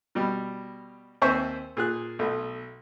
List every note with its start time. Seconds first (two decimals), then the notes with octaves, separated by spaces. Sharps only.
0.15 B2 G3
1.22 D#2 C4 C5 E5 G#5 C#6
1.77 A#2 G#4 F#6
2.19 B1 A3